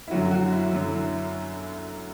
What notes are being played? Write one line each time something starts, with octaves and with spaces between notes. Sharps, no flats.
E4
F#2 D3 F#3 F#4
F#4
E4
F#2 D3 F#3